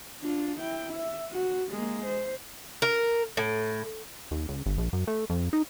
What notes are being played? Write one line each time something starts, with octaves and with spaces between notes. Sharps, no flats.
D4 F4
E4 G5
E5
F#4
G#3 A#3
C5
A#4
A2
D#2
C#2
G1
A#1
F#2
A3
F2
D#4